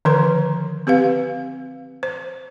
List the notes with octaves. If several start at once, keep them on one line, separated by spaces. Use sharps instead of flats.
D3 D#3 F3 A#4 B4 C6
C4 G4 B4 F5
C5